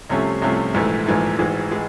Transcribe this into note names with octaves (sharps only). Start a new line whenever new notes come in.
C2 C3 F3 A3 C#4
C2 C3 F3 A3 C#4
A#1 G#2 E3 A3
A#1 G#2 E3 A3
G#1 G#2 E3 G#3
E3 G#3